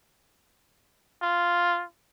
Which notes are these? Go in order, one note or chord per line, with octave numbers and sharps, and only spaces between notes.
F4